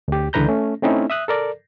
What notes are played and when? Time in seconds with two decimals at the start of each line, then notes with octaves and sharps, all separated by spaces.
0.08 D2 G4
0.33 C#2 D3 E3 B4 A#5 G6
0.48 A3 C#4
0.82 A3 C4 C#4 D#4 E4
1.10 E5 D#6 F#6
1.28 A4 A#4 D5